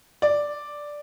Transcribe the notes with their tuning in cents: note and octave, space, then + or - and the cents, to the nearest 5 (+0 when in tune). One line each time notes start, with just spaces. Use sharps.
D5 +0